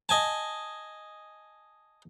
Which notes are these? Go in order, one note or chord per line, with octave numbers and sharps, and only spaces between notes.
D#5 G#5 A5